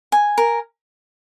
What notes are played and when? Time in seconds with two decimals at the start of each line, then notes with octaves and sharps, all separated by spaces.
0.12 G#5
0.38 A#4